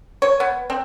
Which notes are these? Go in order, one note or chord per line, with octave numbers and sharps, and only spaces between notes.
C#5
B3
C4